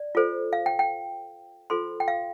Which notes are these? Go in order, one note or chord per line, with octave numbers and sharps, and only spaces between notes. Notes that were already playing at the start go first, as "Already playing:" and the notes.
Already playing: D5
F4 A4 C5
F5
G5
G5
F4 A4 C5 C6
G5
F5